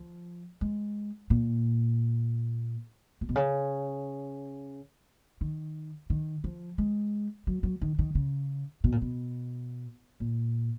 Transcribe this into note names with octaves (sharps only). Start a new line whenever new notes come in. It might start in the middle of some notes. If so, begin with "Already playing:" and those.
Already playing: F3
G#3
A#2
A#2
B2
C#3
D#3
D#3
F3
G#3
F#3
F#3
D#3
D#3
C#3
B2
A#2
B2
A#2